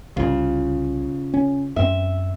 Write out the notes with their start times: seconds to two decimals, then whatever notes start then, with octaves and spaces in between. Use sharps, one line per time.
0.17 C2 C#3 F4
1.34 C#4
1.76 F#2 B3 C4 E5